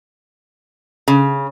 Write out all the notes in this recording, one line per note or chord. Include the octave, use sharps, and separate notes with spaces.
C#3